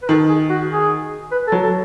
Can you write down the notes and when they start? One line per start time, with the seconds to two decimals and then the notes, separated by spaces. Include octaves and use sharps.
0.02 B4
0.09 D#3 A4
0.29 G#4
0.50 F#4
0.70 G#4
1.32 B4
1.47 A4
1.52 F#3
1.63 A4